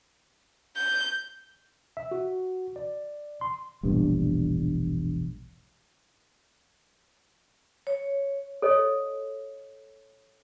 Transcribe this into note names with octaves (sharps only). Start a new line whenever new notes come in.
G6
E5
F#4
D5
C6
E1 A#1 G2
C#5
A4 C#5 D#5